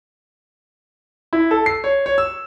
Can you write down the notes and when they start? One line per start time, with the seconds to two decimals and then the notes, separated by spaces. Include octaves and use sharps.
1.33 E4
1.51 A4
1.66 C7
1.84 C#5
2.06 C#5
2.18 E6